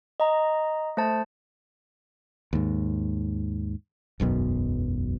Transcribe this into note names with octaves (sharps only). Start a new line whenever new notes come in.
D#5 A#5
A3 C5 A5
D#2 G#2
E1 B1 F#2 B2